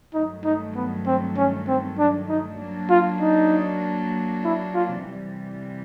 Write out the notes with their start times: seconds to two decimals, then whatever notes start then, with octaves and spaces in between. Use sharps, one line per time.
0.14 G2 D#3 F#3 A3 D#4
0.44 D#4
0.75 B3
1.07 C4
1.37 C#4
1.68 C4
1.99 D4
2.29 D#4
2.59 F#3 A#3 D4
2.90 F4
3.21 D#4
4.44 E4
4.74 F4
5.05 C3 E3 G3